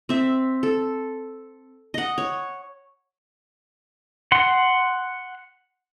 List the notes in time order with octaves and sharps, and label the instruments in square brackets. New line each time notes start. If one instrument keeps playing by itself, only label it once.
[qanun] C4 E5
A4
D#5 F#5
C#5
[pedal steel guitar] F#5 C6